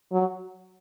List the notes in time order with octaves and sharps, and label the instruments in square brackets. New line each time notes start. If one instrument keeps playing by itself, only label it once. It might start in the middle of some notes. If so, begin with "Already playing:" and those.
[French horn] F#3